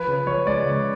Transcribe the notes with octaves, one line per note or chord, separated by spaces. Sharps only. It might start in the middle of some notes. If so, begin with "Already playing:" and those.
Already playing: F3 B4
C#3
F3 C#5
G#3 D5
C#3